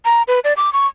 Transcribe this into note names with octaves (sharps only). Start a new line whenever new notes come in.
A#5
B4
D5
D6
C#6